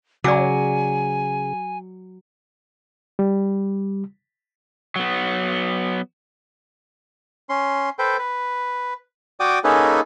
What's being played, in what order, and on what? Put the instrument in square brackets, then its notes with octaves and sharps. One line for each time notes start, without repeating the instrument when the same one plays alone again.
[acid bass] C#3 [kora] F#3 [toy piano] D5 D6 [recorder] G#5
[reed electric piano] G3
[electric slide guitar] F#3 B3
[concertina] C#4 C6
A4 B4 C5 G5
B4
F#4 D5 G5 D6 D#6
A#3 C#4 D#4 G#4 A4 B4